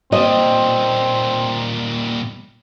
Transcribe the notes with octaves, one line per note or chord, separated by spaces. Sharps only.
A#2 G3 C4 D#5